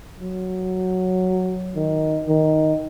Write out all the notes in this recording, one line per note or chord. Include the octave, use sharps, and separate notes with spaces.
F#3
D#3
D#3